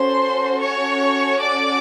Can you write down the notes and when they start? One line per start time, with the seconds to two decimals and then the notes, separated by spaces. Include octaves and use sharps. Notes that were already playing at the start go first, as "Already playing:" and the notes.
Already playing: C#4 F#4 A4 C5 C6
0.62 C#5 C#6
1.42 D5 D6